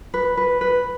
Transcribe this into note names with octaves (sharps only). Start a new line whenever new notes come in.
B4
B4
B4